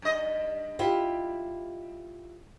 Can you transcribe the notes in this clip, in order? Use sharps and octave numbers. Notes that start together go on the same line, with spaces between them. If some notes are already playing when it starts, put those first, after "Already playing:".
G2 D#5
E4 F4 G4